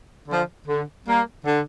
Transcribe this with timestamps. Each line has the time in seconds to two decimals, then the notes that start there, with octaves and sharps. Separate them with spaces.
0.28 D3 F3
0.68 D3
1.07 G3 A#3
1.46 D3